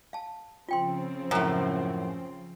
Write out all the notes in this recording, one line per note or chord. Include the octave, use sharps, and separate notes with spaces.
F5 A5
C#3 F3 C4 F4 G5 C6
F#2 A2